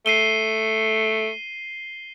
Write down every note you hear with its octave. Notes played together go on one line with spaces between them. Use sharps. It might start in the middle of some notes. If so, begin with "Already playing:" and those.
A3 C7 D#7 G7